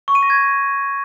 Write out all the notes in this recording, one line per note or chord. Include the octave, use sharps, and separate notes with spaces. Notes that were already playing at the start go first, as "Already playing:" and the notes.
C#6
D#7
A#6
G#6